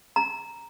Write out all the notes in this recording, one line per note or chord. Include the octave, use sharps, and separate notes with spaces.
A#5